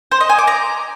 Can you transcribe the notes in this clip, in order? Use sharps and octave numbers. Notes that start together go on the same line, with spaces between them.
C5
D#5
G#5
D6
A#5